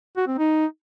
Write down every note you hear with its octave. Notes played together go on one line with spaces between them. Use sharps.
F#4
C4
D#4